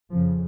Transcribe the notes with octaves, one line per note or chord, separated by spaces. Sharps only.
F2 C#3 F3